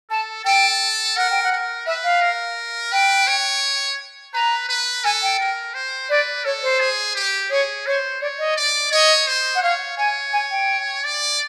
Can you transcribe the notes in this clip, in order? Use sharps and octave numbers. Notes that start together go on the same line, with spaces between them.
A4 A5
A4 G5
A#4 F#5
G5
F#5
A#4
B4 E5
F5
A#4
B4 G5
C#5
B4 A#5
B4
A4 G#5
G5
A#4
C5
B4 D5
A4 C#5
C5
G#4
G4
G#4 C#5
C5 C#5
C#5 D5
D#5
D5
C#5 D#5
C5
F#5
C#5 F5
C#5 G#5
G#5
G5
D5